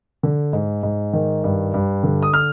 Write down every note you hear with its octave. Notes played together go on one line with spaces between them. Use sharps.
D3
G#2
G#2
D#3
G2
G2
D3
D#6
F6